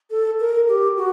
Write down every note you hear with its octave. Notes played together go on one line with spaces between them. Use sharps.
A4
A#4
G4
F#4